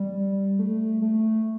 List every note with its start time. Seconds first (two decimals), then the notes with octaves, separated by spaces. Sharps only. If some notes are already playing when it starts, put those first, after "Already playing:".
Already playing: G3
0.59 A3
1.02 A3